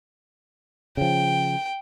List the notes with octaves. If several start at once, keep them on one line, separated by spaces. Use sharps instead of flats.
C#3 F3 G5